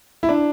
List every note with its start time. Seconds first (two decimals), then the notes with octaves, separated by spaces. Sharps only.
0.23 E4
0.29 D4